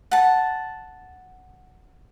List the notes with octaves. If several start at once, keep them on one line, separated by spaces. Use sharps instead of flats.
F#5 A5